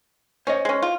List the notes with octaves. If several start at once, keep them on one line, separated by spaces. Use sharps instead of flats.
C#4 C5 C#5 D#5
G#3 C#4
F4